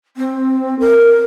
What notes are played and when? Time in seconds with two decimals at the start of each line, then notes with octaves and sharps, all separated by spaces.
0.16 C4
0.79 A#4